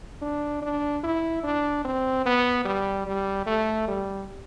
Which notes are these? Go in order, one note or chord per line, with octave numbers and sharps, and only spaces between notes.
D4
D4
E4
D4
C4
B3
G3
G3
A3
G3